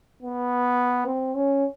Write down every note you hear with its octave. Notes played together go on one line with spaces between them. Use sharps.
B3
C4
C#4